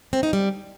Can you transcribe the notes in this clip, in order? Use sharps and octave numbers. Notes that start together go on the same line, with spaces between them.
C4
D#4
G3